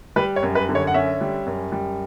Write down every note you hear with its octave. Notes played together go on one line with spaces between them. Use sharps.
G3 B4
C#5
F#2
B4
D3
C#5
F#5
C#4 E5
G3
F#2
G3